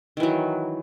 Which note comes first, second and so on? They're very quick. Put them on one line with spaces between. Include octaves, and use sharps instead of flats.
D#3 E3 F#3